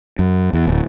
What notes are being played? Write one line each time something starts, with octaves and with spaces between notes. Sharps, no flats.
F#2
E2
D1